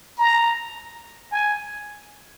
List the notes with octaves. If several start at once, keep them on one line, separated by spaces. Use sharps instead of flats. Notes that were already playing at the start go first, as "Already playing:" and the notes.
A#5
G#5